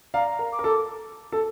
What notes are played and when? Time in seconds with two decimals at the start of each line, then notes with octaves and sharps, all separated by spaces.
0.14 D5 F5 A#5
0.39 A#4
0.52 D6
0.59 A#4
0.64 A4
1.32 A4